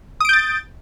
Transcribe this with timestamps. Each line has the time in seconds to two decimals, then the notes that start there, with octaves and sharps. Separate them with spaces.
0.20 D#6
0.25 D7
0.29 G6
0.33 A6